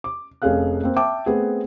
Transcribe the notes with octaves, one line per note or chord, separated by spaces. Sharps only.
D6
F1 C#4 G#4 A4 F5 F#6
A#3 C4
E5 G5 A5 D6
A3 B3 C4 G#4